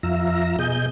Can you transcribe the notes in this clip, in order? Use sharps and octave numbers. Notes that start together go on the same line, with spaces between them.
F2 F4 E5 A#5
B2 G#4 D#5 G6